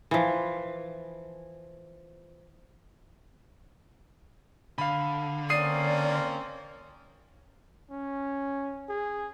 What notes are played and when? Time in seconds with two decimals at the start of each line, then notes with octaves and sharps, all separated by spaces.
0.11 E3 F3
4.78 D3 F5 B5
5.50 A#3 C4 C#4 D5 D#6 C7 D#7
7.91 C#4
8.89 G#4